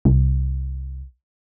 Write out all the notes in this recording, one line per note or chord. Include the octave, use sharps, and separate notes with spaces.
C2